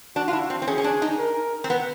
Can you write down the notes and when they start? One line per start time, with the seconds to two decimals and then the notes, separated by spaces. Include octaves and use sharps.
0.16 D4 F#4
0.28 F4
0.33 E4
0.50 C4
0.62 C4
0.67 C#4 G#4
0.78 C#4
0.84 D4
1.02 D#4
1.18 A#4
1.64 C4
1.70 B3